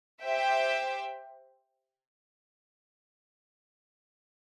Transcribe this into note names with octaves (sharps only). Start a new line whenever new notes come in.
G4 C5 E5 G5